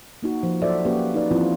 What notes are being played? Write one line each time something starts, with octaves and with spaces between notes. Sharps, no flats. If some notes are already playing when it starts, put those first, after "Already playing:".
A#3 D#4 F#4
F3
F#3 F#4 A4 C5 D5 E5
A#3 C#4 F#4 G4 B4
D#4 B4 D5
E3 F3 C4 E4 F4